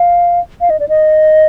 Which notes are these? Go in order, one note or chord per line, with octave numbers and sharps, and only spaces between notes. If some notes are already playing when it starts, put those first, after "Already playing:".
Already playing: F5
F5
D#5
D5
D#5